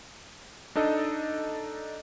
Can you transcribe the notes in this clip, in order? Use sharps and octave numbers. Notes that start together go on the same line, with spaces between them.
D4 D#4 A4 D#5